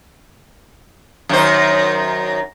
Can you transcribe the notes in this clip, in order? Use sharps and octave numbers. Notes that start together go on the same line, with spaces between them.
F#2 D#3 C5